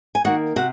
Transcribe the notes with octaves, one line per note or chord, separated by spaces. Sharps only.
G#5
D#3 A#3 F#4 F#5
C3 F#4 F#5